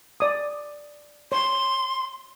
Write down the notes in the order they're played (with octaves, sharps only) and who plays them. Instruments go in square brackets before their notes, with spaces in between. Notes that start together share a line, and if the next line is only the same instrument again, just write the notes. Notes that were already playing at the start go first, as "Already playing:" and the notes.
[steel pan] D5 D#6
[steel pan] C#5 [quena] C6